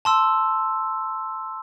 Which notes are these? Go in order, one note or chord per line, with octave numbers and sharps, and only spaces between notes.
A5 C6 E6